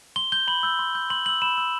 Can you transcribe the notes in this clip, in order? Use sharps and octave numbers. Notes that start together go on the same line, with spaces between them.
C6 G7
G6 G7
B5 F#7
E6 G6
C6
G6
C6 F#7
E6 G6 F#7
B5 E7
E6 G6